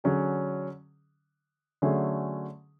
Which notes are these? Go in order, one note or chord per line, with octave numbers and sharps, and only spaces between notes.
D3 F#3 C#4 G#4
D3 F#3 A3 C#4 G#4